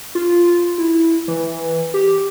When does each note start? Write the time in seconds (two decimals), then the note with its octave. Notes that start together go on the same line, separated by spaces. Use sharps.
0.15 F4
0.78 E4
1.28 E3
1.94 G4